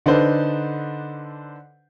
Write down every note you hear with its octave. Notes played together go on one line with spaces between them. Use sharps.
D3 D4 D#4 A4 B4 C5